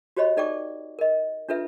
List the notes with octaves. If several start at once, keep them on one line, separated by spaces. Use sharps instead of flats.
F#4 G4 C5 C#5 D#5 B5
D#4 A4 D5 G5 C#6 D6
A#4 D#5
D4 F4 A4 B4 E5